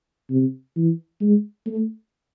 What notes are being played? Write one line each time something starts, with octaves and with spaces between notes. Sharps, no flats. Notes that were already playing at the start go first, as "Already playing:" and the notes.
C3
E3
G#3
A3